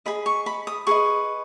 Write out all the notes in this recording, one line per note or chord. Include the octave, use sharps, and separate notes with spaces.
G#4 D#5 B5
C#6
B5
D#6
G#4 B4 D#5 C#6